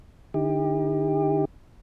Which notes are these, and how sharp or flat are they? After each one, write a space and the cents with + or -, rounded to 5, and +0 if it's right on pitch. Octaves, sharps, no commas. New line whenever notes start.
D3 +30 D#4 +45 G4 +30